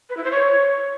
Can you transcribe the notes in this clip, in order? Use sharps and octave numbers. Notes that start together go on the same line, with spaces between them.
B4
E4
C5
C#5